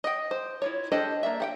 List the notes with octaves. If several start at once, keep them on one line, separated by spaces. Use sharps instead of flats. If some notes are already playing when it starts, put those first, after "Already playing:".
D#5 F#5 G5
C5
E4 F4 C#5
D4 G4 A4 C5 D#5
A#3 D4 E5
G4 F#5 G5